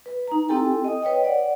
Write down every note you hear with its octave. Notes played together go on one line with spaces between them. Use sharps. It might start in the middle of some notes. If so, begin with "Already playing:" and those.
B4
D#4 A#5
C4 E4 G4 A4 G5 G#5
D#5 D#6
B4 C#5 D#5 G5
D5 F#5